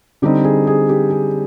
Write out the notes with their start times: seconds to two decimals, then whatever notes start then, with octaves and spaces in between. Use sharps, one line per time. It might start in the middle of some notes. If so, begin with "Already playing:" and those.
0.22 D3 G3 C4 D#4 G4
0.44 G#4
0.67 G#4
0.89 G4
1.10 G#4